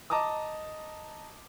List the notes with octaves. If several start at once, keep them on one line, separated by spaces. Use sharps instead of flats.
D#5 A5 A#5 D6 D#6